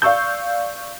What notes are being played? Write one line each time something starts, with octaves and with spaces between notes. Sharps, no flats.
D5 F5 C#6 E6 G6